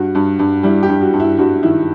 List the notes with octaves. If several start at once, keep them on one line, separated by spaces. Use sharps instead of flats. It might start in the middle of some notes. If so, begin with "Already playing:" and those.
Already playing: G2 F#4
G2
G2
G3 E4
G4
G2
F#4
G2
E4
G2 F#4
D#3 E4